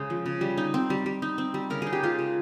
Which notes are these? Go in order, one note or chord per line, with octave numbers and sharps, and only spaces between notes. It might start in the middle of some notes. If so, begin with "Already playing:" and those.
Already playing: C#3 G#3 C5 D#5
F3
C#3
G3
D#4
C4
G3
G3
D#4
C4
G3
C#3 A#4
D#4 G#4
G4
G#3 F4 G#4
C#3